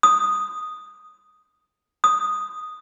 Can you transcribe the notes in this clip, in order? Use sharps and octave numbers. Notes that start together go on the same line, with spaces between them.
D#6
D#6